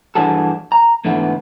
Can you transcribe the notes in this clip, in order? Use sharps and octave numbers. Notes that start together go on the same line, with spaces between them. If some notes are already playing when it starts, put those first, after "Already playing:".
G2 E3 D4 F#4 G#4 A4
A#5
G#2 D3 E3 A3 B3